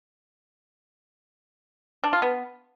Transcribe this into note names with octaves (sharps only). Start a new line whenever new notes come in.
D4
F4
B3